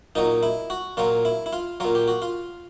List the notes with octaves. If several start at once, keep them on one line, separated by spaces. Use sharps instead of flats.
A#2 F#3 D#4
E4
F#4
A#2 F#3 F4
E4
E4
F4
A#2 F#3 F4
G4
F#4
F4